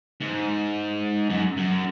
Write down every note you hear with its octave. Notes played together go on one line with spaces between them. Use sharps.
G#2
F#2
F#2